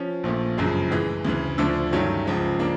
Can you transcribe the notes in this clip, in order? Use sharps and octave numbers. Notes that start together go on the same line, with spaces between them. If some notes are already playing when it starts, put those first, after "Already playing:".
Already playing: F3 C#4
A#1 A#2 F3 A3
G1 F#2 C#3 F3 G#3
A2 E3 G#3
D2 C#3 E3
D2 D3 F3 A3 D4
G2 D#3 F#3 A3 C#4
C#2 C#3 F3 G#3
C#3 F3 A#3 D4